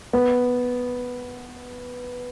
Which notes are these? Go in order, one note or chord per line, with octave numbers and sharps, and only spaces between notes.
B3